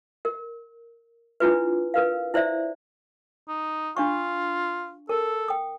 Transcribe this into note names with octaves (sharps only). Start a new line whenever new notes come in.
A#4
D4 E4 F4 B4
A#4 B4 F5
E4 C5 D5 E5
D#4
D4 F4 F5 C#6
A4 A#4
G5 D#6